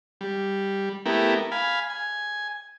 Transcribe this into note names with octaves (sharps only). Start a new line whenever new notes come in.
G3
A3 B3 E4 G4 A#4
F5 G#5 B5
G#5